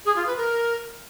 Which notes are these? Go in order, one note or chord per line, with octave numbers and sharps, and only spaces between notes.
G#4
F4
B4
A#4